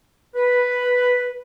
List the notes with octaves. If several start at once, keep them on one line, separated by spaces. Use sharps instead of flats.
B4